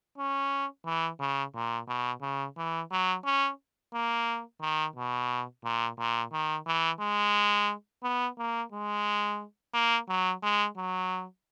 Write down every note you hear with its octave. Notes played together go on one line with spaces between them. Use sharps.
C#4
E3
C#3
A#2
B2
C#3
E3
F#3
C#4
A#3
D#3
B2
A#2
A#2
D#3
E3
G#3
B3
A#3
G#3
A#3
F#3
G#3
F#3